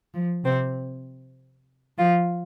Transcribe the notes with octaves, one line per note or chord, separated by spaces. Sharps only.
F3
C3 C4
F3 F4